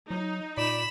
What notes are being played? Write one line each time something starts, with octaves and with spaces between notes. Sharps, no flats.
F#3 D#4
A#2 D5 B5 E7